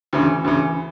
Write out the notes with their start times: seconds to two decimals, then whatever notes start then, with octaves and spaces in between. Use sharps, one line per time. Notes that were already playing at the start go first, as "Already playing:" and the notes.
0.13 D2 C#3 E3
0.44 D2 C#3 E3